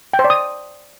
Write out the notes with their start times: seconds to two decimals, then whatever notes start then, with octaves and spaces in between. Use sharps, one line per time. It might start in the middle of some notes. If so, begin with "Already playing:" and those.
0.13 G5
0.19 C5
0.24 D5
0.30 D#6